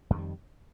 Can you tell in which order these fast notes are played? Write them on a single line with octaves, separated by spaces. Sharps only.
F2 D#3 G3